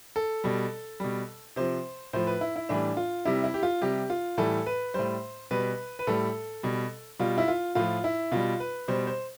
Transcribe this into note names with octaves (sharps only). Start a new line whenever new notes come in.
A4
B2 G3
B2 G3
C3 F3 C5
A2 F3 C5
B4
E4
E4
A2 E3 G3 D4
F4
C3 G3 E4
E4
G4
F4
C3 G3 G4
F4
A2 E3 G3 A4
B4
A2 G3 C5
B2 G3 B4
B4
A2 G3 A4
B2 G3
B2 G3 F4
E4
F4
A2 F3 F4
E4
B2 G3 F4
B4
B2 G3 C5
C5